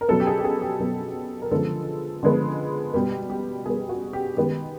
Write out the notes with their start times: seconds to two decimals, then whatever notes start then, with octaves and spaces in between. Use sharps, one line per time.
0.01 A#4
0.08 B2 F#3 B3 A4
0.20 G4
0.27 G#4
0.39 G4
0.44 G#4
0.62 G4
0.80 B2 F#3 B3 G#4
1.42 A#4
1.51 D3 F3 G#3 B3 A4
2.23 D3 F3 G#3 B3
2.94 B2 G3 B3 G4
3.30 G4
3.66 B2 G3 B3 G#4
3.89 F#4
4.13 G4
4.37 D#3 G#3 B3 G4